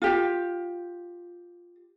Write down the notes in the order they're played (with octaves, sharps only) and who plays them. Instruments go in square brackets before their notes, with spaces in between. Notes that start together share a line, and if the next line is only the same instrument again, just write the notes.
[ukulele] F4 G4